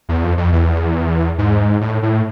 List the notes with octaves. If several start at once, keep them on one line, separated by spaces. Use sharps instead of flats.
E2
F2
F2
E2
G#2
A2
A2